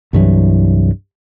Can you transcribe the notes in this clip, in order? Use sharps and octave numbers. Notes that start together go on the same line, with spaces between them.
C2 G2 E3 F#3